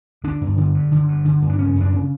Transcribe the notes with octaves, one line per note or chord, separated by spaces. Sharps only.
D3 D4
G2
D3
G2
D3
G2
D3
G2
D4
C#3 C#4
F#2
D4
C#3